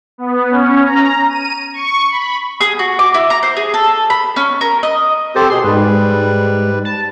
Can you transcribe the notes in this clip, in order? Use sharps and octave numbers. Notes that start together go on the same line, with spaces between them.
B3
C#4
A#5
D#7
C#6
B5
G#4
F#4
D6
E4
A#5
C5
G#4
A4
B5
C#4
A#4
D#5
C4 G4 A4 C5
B2 G#4 C6
G#2 G3 B4
A5